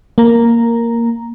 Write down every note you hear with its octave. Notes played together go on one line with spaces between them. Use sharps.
A#3 A#5